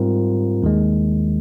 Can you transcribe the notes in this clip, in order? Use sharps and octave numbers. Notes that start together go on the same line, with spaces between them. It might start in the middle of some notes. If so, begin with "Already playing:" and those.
Already playing: G#2 G3 C4 F4 A#4
D#2 D#3 G#3